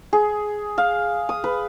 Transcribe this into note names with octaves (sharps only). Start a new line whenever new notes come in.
G#4
F5
D#6
B4